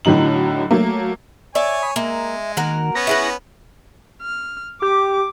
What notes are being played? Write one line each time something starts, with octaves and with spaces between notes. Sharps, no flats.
A2 D3 F#3 D#4 F#7
F#3 A3 A#3
C#5 D5 E5 G#5
B5 D#6
G#3 A#3 E5
D#3 A#3 F#4 A#4
B3 C#4 C#6 A#6
E4 G#4 B4
F6
G4 D6